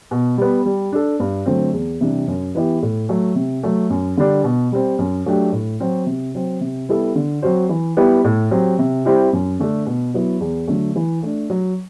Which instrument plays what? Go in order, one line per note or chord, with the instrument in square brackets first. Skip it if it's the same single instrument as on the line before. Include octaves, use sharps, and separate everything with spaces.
[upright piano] B2
G3 B3
G3
D4 A4
G2
D3 F#3 A3 C4
E2
C3 E3 G3 D4
F#2
E3 B3 E4 G4
A2
F#3 A3
C3
F#3 A3
F#2
D3 G3 D4
B2
G3 C4
F#2
F#3 A3 D4 G4
A2
F#3 C4 F#4
C3
F#3 C4
C3
G3 B3 E4 A4
D3
F#3 C4 F#4 C5
E3
G3 B3 E4 G4
A2
F#3 C4 G4
C3
G3 C4 E4 G4
F#2
D3 A3 D4 A4
B2
F#3 B3 E4
E2
D3 F#3 A3
E3
A3 D4
F#3